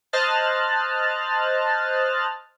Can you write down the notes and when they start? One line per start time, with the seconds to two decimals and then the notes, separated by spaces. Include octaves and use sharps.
0.13 C5 D#5 A5 F6 F#6 A6